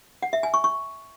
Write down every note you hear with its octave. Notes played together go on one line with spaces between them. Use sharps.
F#5
E5
G#5
C#6
C#6